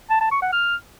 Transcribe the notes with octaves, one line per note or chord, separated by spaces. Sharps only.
A5
A5
C#6
F#5
F6